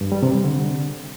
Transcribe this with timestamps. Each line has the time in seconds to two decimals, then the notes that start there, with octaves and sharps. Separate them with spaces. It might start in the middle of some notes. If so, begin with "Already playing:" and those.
0.01 G2
0.12 G3
0.23 C3
0.33 G3
0.44 D3